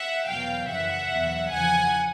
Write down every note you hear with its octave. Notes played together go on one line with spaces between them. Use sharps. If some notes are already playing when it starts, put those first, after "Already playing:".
Already playing: E5 F#5
E2 B2 F#3 F5 G5
F#2 C#3 E3 E5 F#5
E2 B2 F#3
E2 C#3 F3 F#5 G#5